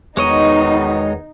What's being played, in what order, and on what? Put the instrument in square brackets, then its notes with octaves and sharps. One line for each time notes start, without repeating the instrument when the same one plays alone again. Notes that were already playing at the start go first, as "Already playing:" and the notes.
[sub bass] E2 [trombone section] B2 D#3 B3 [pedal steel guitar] G#3 C#5 D#5 [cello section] D#4